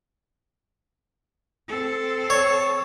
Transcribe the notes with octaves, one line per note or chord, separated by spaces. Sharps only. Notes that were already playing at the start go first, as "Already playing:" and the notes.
C4 A4
C#5